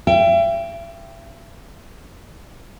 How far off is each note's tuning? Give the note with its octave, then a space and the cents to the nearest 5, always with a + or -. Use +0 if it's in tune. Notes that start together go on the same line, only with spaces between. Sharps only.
E5 +40 G5 +0